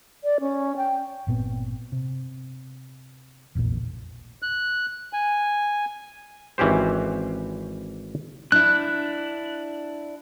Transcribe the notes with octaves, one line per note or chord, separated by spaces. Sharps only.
D5
C#4
G5
G1 A#2 B3 C4
C3
F1 A#1 E2 A#2
F#6
G#5
G#1 E3 C#4 G4 C5
D4 E4 F#6